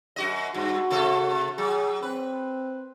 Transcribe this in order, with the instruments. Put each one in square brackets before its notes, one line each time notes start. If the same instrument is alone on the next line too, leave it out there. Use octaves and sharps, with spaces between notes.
[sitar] F#2 F#4 D#5
[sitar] G2 [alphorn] F#4
[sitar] C3 A3 A4
[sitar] F#3 [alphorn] G#4
[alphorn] C4 [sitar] B4